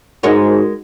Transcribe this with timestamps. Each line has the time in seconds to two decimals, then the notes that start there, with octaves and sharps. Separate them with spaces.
0.23 G#2 G#3 D#4 F#4 A#4 C#5